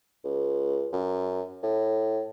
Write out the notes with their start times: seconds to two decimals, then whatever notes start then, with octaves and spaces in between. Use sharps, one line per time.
0.24 C#2
0.93 F#2
1.63 A2